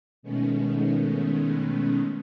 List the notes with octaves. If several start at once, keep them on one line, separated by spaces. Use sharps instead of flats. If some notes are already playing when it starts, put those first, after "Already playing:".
B2 D#3 G#3 A3 B3 C#4